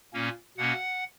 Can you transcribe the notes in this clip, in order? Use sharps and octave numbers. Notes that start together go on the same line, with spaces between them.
A#2 A#3 C#4
B2 A#3 C#4 F#5